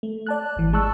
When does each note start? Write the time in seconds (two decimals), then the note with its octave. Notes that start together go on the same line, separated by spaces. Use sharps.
0.03 A3
0.27 D5 A5 F#6
0.56 G#1 E3
0.73 G#3 A5 C#6 E6 F#6